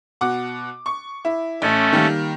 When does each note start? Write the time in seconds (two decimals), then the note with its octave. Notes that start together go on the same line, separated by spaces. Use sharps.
0.21 B2 F#5 D6
0.86 C#6
1.25 E4
1.62 A1 A3 C#4
1.93 D#3 G3 A#3